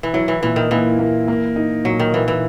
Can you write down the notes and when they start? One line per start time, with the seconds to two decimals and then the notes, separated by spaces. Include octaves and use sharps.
0.03 E3
0.13 F#3 E4
0.28 E3
0.43 A#2 E3
0.56 D#3
0.71 E3 A#3
0.99 A#3
1.28 A#3
1.56 D#4
1.85 A#2 F#3
1.99 D#3
2.14 E3 A#3
2.28 E3